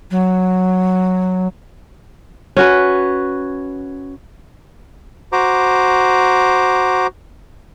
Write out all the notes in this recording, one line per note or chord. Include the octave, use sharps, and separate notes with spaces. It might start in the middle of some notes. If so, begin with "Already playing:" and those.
F#3
C#4 F#4 B4
F#4 C5 A#5 D6